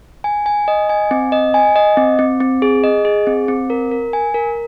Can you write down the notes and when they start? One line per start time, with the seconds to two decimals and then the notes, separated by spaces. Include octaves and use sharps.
0.24 G#5
0.46 G#5
0.68 D#5
0.89 G#5
1.11 C4
1.32 D#5
1.54 G#5
1.76 D#5
1.97 C4
2.19 C4
2.40 C4
2.62 G#4
2.84 D#5
3.05 G#4
3.27 C4
3.48 C4
3.70 A#4
3.91 A#4
4.13 G#5
4.34 A#4